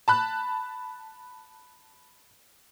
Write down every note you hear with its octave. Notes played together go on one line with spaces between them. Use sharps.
A5 B5 F#6